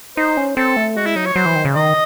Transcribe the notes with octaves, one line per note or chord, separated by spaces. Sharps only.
D#4 C5
C#4
C4 A4
A3
G#3 F#4
E4
F#3 D#4
C#5
F#3 C5
E3
D#3
C#3
D#3 D#5